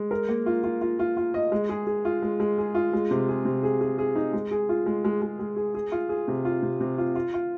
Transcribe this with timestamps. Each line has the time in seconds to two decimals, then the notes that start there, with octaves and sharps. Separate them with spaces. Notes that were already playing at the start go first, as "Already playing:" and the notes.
Already playing: G#3
0.11 A#4
0.29 A#3
0.46 F4
0.64 F4
0.81 F4
0.99 F4
1.17 F4
1.34 D#5
1.52 G#3
1.69 G#4
1.87 G#4
2.05 F4
2.22 G#3
2.40 G#3
2.58 G#4
2.75 F4
2.93 G#3
3.11 C3
3.28 G#4
3.45 C3
3.63 G#4
3.81 G#4
3.98 G#4
4.16 D#4
4.33 G#3
4.51 G#4
4.69 F4
4.86 G#3
5.05 G#3
5.22 G#3
5.39 G#3
5.56 G#4
5.75 G#4
5.92 F4
6.09 G#4
6.28 C3
6.45 F4
6.62 C3
6.80 C3
6.98 F4
7.15 F4
7.33 F4